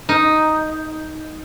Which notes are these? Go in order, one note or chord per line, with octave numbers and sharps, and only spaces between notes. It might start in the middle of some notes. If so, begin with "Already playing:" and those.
D#4